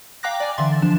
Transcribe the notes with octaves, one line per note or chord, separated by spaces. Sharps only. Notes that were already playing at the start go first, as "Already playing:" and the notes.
F5 G5 A#5 D6 F#6 A#6
D5 G#5
D3 E3 E5 C6 A6
F3 D4 E7